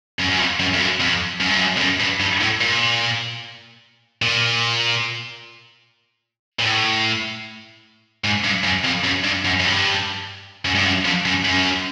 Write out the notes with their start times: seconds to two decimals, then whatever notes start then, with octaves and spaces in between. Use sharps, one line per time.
0.20 F#2
0.30 F#2
0.39 F2
0.60 F#2
0.73 F2
0.80 F#2
1.00 F2
1.40 F#2
1.48 G2
1.58 F#2
1.76 F2
1.80 F#2
2.00 G2
2.20 G2
2.41 A2
2.61 A#2
4.22 A#2
6.59 A#2
6.63 A2
8.24 G#2
8.44 G2
8.64 F#2
8.84 F2
9.04 F#2
9.24 G2
9.45 F#2
9.60 F#2
9.64 G2
10.65 F#2
10.75 G2
10.85 F#2
11.05 F2
11.25 F#2
11.45 F#2